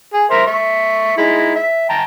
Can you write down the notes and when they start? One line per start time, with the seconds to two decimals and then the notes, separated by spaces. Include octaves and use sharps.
0.14 G#4 G#5
0.30 A#4 C5 E5
0.47 E5 C#6
1.17 G#3 D#4 E4
1.56 E5
1.89 G5 A5 A#5